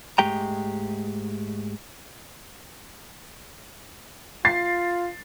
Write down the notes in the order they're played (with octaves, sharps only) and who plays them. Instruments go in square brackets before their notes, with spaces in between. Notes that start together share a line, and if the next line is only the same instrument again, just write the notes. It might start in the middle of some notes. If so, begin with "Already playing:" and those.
[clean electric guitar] G#2 G#3 A3 G4 G5 A#5
[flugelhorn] F4 [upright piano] A6 C7